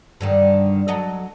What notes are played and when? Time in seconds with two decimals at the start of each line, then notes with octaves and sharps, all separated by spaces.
0.21 G2 D3 D#3
0.88 F#3 A4 D#5